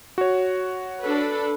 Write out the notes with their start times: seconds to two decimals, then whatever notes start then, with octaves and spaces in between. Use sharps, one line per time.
0.18 F#4 C#5
1.01 D4 A4 B4